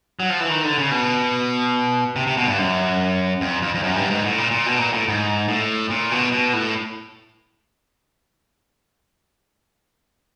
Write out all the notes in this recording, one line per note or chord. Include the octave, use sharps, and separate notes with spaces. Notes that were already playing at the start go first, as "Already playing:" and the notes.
F#3
F3
E3
D#3
D3
C#3
B2
C3
C3
B2
G2
F#2
F2
F2
F2
F#2
G2
G#2
A2
A#2
A#2
B2
A#2
A2
G#2
A2
A#2
B2
B2
A2